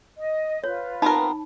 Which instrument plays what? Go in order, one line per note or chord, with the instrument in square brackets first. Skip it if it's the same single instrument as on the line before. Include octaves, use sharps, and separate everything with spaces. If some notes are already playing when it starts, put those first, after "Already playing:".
[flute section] D#5
[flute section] F4 B4 [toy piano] C#5
[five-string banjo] B3 C4 A#4 [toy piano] D#4 A5 B5